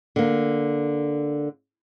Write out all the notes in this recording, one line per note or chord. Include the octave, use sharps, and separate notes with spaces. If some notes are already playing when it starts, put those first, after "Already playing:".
D3 A#3